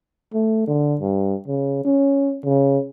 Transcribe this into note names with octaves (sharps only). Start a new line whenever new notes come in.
A3
D3
G2
C#3
C#4
C#3